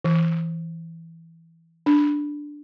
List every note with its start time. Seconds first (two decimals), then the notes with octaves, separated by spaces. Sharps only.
0.05 E3
1.86 D4